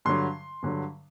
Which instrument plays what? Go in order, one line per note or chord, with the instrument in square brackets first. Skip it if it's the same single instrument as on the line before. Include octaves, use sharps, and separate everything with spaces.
[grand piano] G2 D3 F#3 C6
G2 D3 F#3